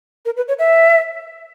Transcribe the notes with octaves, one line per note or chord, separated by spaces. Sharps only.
A#4
B4
C#5
E5